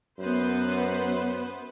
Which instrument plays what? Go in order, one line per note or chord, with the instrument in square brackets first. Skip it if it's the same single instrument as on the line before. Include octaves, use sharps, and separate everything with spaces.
[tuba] F#2 [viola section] B3 B4 C5